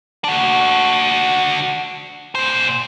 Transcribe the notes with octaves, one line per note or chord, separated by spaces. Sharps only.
D4 F#4
A#2 C5